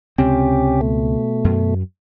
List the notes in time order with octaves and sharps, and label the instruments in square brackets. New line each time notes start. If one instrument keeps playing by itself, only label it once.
[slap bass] C#2 C4 [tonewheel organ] C3 C#4 G4
[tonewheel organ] B2 A3
[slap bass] F#2